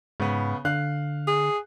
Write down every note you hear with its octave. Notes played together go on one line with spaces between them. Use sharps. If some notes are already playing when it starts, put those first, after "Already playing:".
G#2 C#3 B3
D3 F5 F#6
G#4